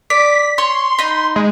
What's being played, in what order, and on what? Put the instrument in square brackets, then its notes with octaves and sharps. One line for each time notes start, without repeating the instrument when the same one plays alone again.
[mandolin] D5 [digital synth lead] B6
[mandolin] C#5 [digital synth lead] C6
[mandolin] D#4 B5
[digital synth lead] G#3